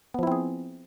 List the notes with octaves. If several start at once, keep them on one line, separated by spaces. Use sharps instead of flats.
F3 B3 C4 E4 G#4